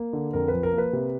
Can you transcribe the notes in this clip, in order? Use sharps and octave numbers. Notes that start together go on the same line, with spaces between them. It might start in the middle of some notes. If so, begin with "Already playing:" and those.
Already playing: A#3
D3
F2 A#4
F3 B4
A#4
A#3
B4
C3